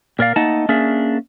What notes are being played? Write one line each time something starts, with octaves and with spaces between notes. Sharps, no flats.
A#2 A#4 D5 F5
A3 A#3 D#4 D#5 F#5 A5
A#3 C#4 D4 G#4 A#4 E5